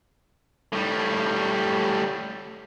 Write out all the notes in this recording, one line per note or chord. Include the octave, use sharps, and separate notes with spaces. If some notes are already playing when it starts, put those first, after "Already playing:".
A2 G3